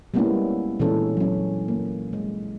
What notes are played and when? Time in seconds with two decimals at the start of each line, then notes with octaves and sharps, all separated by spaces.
0.14 G3 G#3 A#3 B3 C#4 E4
0.79 A#2 E3 G#3 C#4 D4 A4
1.17 F#3 C#4
1.68 A#3
2.13 G#3